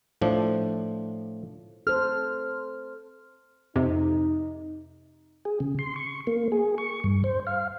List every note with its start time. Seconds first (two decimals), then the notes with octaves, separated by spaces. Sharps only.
0.22 A2 F3 D4
1.87 A4 C5 F6
3.76 F2 C3 D#4
5.45 G#4
5.60 C#3
5.79 C6
5.96 C#6
6.27 A#3
6.52 G#4
6.78 C#6
7.04 G2
7.24 C5
7.47 F5